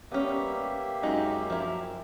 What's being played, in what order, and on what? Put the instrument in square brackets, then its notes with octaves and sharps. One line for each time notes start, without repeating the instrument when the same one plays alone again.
[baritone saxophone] G3 [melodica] A#3 G4 E5 [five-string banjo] B3 C#4
[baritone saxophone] F#2 [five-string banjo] G#3 D#4
[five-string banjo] F3 E4